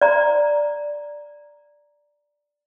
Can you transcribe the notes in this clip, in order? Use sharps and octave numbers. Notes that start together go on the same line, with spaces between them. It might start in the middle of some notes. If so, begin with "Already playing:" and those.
D5 A#5